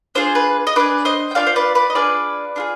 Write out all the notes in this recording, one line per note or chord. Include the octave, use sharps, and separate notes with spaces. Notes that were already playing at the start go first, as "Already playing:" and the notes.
D4 F4 G#4 C5
B4
D#5
D4 F4 G#4 B4 D5
C5 D#5
G5
D4 F4 G#4 D5 F5
C5
B4 D5
B4 D5
D#5
D4 F4 G#4 B4 D5
D4 F4 G#4